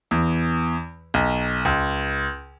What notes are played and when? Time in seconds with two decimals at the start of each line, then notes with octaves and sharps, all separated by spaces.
0.11 E2
1.14 B1
1.65 C#2